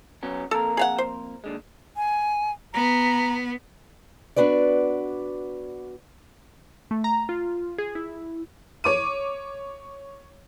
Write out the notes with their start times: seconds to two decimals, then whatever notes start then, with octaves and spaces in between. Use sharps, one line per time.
0.23 F#3 B3 C#4
0.51 F2 A#3 A4 A#4
0.77 G#4 F5 F#5
0.98 C5
1.44 D#2 D3 G#3
1.97 G#5
2.74 B3 A#5
4.36 B3 D4 F#4 B4 D5
6.91 A3
7.04 A#5
7.29 F4
7.78 G#4
7.95 E4
8.84 C#5 D6 D#7